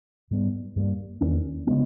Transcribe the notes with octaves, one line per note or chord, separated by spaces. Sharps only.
G#2 G3 B3
G2 G3 A#3
E2 D#3 A#3 C#4
C#3 G#3 B3